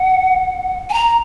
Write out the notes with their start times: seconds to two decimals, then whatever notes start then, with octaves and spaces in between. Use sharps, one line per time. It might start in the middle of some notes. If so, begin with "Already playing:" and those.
Already playing: F#5
0.90 G#5
0.93 A#5